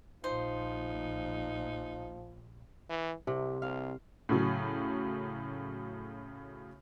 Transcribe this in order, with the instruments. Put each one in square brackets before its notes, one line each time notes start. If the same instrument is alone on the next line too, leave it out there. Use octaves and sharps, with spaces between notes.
[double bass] A#1 A#2 [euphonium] F3 [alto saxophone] D#4 [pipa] C5
[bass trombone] E3
[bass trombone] C2 [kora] C3
[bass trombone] C2 [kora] F5
[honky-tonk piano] A2 C#3 F#3